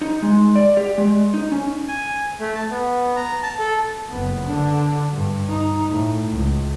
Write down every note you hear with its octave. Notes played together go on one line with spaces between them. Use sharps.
D#4
G#3
D5
G4
G#3
D#4
C#4
G#5
A3
A5
B3
A#5
A5
A4
F#1 B3
D3 D4
G2
D#4
A2
C#2